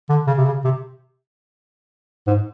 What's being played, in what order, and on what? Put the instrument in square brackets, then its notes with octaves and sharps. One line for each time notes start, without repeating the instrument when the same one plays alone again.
[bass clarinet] D3
C#3
C3
C#3
C3
G#2